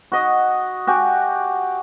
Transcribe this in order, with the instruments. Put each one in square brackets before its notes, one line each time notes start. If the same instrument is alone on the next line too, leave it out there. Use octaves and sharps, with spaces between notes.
[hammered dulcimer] F#4 D#5
F#4 G4 G#5